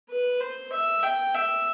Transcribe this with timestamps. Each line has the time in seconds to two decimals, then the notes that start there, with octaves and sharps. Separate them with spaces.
0.10 B4
0.40 C5
0.73 E5
1.03 G5
1.35 E5